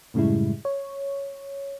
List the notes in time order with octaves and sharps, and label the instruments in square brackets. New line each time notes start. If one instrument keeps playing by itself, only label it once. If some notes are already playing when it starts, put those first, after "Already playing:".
[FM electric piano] F#2 A2 C#3 G3 G#3 E4
C#5